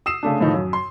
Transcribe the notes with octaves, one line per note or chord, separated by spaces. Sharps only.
D#6 E6 C7 E7
C#3 A3 D4
A2 D#3 F3 D#4
F#2
C6